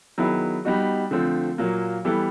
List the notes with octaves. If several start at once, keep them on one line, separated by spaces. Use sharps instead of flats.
D#3 F#3 B3 E4 G#4
G3 B3 D#4 F#4
D3 F3 A3 C4
A#2 F#3 A#3
E3 G3 B3 E4 A4